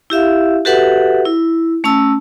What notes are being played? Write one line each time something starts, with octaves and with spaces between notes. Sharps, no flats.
E4 G4 E5 F5
F#4 G4 A4 B4 E5 F#5
E4
A3 C#4 A5 E6